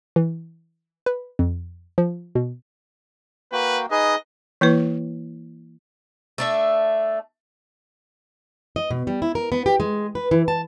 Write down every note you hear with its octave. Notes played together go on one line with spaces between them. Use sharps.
E3
B4
F2
F3
B2
A#3 F#4 B4 G5
D#4 G#4 B4 D#5
E3 A#3 E4 B4
A3 D4 E5
D#5
B2
G3
E4
A#4
B3
G4
G#3
B4
E3
A5